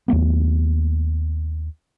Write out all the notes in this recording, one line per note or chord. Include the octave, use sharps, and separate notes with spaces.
D#2 F#3 A3 B3